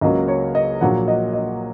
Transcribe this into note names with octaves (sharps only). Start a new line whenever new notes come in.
C#2 C#3 F#3 A#3 D#5
C#5
D#5
A#1 A#2 F#3 A#3 F#5
D#5
D#5